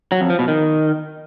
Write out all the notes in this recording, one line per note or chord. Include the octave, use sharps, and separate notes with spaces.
F#3
F2
F3
B2
D#3